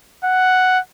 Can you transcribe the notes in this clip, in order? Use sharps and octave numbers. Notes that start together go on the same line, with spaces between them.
F#5